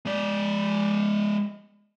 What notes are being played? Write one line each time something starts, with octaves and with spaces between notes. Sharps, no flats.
G#3 D5